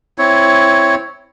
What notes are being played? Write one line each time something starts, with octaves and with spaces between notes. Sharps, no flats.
C4 E4 C#5